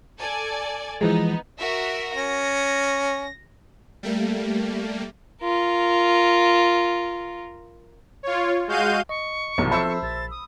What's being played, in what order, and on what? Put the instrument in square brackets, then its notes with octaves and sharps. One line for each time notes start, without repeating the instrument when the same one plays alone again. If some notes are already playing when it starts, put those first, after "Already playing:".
[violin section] A4 D5 G#5
[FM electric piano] E3 F3 G#3 [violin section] B3 D#4
[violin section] F#4 A#4 E5
[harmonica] C#4 [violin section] A#6
[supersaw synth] G3 A3 A#3
[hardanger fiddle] F4 A#4
[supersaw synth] F4 C#5
G#3 F#4 F5 G6 D#7
[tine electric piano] D#5 [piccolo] C#6
[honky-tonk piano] B1 [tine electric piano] C3 E3 F#3
[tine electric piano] F3 C4 A4 [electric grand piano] C5 E5 A5 [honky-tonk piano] B5 E6
[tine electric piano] A#1 [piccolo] A6
[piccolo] D#6